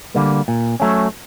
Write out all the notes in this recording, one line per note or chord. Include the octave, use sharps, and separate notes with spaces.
D3 G3 A#3
A#2
F#3 A3 C#4